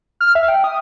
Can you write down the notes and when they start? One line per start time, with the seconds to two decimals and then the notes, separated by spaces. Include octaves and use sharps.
0.21 F6
0.35 E5
0.48 G5
0.64 D#6